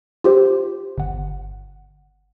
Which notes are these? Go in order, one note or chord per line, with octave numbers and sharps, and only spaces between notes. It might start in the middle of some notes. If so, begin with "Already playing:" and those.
F4 G4 C5
G1 F#5